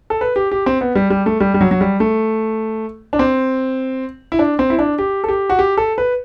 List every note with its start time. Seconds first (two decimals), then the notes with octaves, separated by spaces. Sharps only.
0.10 A4
0.21 B4
0.36 G4
0.52 G4
0.66 C4
0.81 B3
0.95 G3
1.10 G3
1.26 A3
1.40 G3
1.54 G3
1.61 F#3
1.71 F#3
1.81 G3
2.00 A3
3.13 D4
3.19 C4
4.32 E4
4.39 D4
4.59 C4
4.70 E4
4.79 D4
4.99 G4
5.24 A4
5.29 G4
5.50 F#4
5.59 G4
5.77 A4
5.98 B4